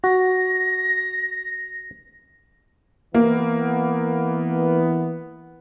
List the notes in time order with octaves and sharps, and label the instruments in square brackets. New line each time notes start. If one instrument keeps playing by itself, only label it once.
[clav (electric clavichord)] F#4 [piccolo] A#6
[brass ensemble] E3 B3 [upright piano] A#3